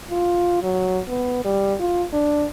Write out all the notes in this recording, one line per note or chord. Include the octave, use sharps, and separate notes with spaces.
F4
F#3
B3
G3
F4
D4